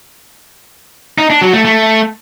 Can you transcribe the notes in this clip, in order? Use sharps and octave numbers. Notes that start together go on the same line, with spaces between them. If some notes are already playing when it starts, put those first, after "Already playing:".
D#4
D4
F#3
A3
A3